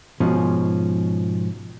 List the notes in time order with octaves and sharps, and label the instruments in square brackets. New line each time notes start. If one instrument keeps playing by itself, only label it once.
[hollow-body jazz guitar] G#2 B2 F3 C#4